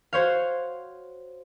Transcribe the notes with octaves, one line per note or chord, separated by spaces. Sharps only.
F#4 C5 C#5 F5